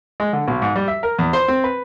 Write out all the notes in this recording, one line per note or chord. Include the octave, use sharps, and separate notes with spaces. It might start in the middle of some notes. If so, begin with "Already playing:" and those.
G#3
D3
B1
G#2
G3
E5
A#4
E2
C5
C4
B4